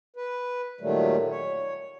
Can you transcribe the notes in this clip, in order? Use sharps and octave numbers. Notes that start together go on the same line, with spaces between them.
B4
A#2 D#3 F#3 G3 A3
C#5